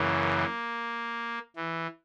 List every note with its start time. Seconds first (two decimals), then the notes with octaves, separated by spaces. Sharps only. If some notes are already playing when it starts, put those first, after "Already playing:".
Already playing: F#2 C#3 E3 A#3
1.56 E3